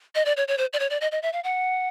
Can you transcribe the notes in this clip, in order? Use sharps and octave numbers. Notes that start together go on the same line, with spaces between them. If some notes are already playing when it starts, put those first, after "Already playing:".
D#5
D5
C#5
C#5
C5
D5
C#5
D5
D#5
D#5
E5
F5
F#5